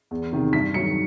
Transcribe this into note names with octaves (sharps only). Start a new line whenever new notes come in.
E2
C3 D#3
G2 B6
D#3 F#3 C#7